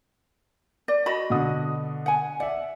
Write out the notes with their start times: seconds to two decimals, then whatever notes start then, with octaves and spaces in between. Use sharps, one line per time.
0.88 D5
1.06 F#4 D#5 B5
1.30 B2 D3 D#6
2.06 F#5 G#5
2.40 D5 E5 F#5